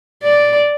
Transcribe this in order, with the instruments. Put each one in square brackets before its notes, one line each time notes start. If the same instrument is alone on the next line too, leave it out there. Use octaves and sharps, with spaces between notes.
[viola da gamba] D5